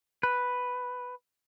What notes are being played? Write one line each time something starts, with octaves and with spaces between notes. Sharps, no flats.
B4